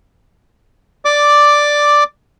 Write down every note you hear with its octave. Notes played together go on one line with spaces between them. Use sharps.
D5 D6